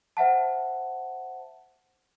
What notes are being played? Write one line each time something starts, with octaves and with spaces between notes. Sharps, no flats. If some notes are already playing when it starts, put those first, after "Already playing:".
C5 E5 F#5 A5